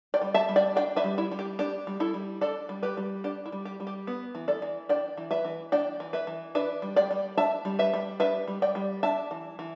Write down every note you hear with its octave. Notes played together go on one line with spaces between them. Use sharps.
D5 G5
G3
E5 A5
G3
D5 G5
D4 D5 G5
B4 E5
G3
E4
G3
G4
D4 G4
G3
E4 A4
G3
D4 A4 D5
G3
G4 B4
G3
D4 G4
E4
G3
G4
G3
G4
B3
E3
A4 D5
E3
D4 D5 G5
E3
B4 E5
E3
D4 D5 G5
E3
B4 E5
E3
D4 B4 E5
G3
D5 G5
G3
D4 E5 A5
G3
B4 E5
G3
D4 B4 E5
G3
D5 G5
G3
D4 E5 A5
E3
E3